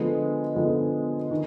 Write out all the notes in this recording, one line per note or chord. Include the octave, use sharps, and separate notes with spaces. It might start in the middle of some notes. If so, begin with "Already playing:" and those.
Already playing: D3 F3 G#3 B3
D3 F3 G#3 B3
D#3